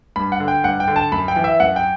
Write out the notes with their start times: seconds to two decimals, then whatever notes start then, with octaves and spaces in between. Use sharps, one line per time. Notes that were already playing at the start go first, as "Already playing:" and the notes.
0.16 G2 B5
0.32 F#5
0.40 D3
0.48 G5
0.64 G2 F#5
0.80 G5
0.88 D3
0.96 A5
1.12 F#2 B5
1.28 G5
1.36 E3
1.44 E5
1.60 F#2 F#5
1.76 G5